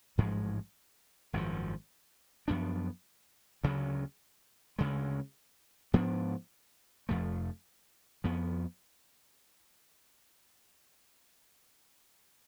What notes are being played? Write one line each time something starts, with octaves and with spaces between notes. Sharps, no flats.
A1 G#2 F3 G#3
G#1 F#2 C#3 F3
F#2 F3 B3 D4
D2 C#3 F#3
D2 C#3 G#3
G#2 F3 B3 D4
F1 F2 F3 A3
F2 F3 B3